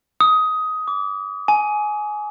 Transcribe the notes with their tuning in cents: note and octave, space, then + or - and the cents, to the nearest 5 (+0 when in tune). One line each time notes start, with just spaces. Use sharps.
D#6 +15
D6 -25
G#5 +15